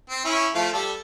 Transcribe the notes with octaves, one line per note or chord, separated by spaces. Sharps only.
C4
C#4 E4
F3 A3 F5
G3 A4